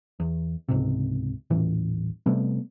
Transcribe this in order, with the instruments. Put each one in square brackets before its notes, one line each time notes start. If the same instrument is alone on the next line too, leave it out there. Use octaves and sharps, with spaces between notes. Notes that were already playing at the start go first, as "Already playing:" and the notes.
[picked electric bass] E2
C#2 G#2 C3
D#1 A1 E3
C3 G3 A3 B3